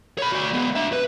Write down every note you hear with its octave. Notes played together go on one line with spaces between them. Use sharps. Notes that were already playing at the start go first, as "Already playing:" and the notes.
C#5 B5
F#4 D5
G#3 B3
D4 E5
B4